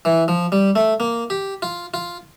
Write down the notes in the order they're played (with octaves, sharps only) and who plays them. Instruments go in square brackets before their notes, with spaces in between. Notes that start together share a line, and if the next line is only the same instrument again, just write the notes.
[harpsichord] E3
F3
G3
A3
A#3
G4
F4
F4